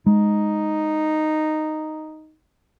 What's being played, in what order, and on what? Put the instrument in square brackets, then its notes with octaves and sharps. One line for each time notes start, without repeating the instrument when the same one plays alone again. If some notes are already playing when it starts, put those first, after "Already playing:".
[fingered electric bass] G#3 [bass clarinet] D#4